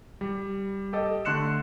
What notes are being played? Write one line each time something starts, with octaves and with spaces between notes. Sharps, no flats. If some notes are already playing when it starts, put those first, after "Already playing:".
G3
G4 A4 D#5
D3 A3 C6 F#6 C#7 E7